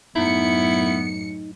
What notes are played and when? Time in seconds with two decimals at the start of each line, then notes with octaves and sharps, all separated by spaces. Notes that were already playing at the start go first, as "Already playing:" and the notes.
0.16 F#2 A2 B3 D#4 E4 C#7